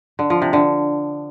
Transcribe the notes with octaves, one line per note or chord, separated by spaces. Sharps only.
D3
F3
C3
D3